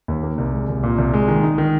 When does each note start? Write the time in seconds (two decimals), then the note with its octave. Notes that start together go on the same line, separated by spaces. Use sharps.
0.08 D#2
0.23 A#3
0.38 C2
0.53 G#3
0.68 C2
0.83 A#2
0.98 C2
1.13 G#3
1.28 D#3
1.43 D#4
1.58 D#3